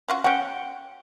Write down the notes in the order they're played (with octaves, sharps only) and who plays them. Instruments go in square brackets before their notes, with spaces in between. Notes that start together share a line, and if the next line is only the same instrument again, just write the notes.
[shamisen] C#4 F4 F#4
[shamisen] C#4 F#4 [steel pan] F#5 G5